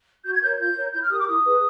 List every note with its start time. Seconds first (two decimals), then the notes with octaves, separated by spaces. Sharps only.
0.24 F#4 G6
0.32 G#6
0.41 A#4 C#5 G6
0.58 F4 G6
0.76 A#4 C#5
0.92 E4 G6
1.02 F6
1.10 G4 D#6
1.13 A#4
1.18 D6
1.27 E4 D#6
1.44 G#4 B4